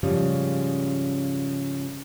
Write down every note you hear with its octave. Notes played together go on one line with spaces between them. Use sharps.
G#2 C#3 F3 G3 G#3 C#4